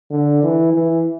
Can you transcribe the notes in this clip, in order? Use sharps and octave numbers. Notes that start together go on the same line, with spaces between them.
D3
E3
E3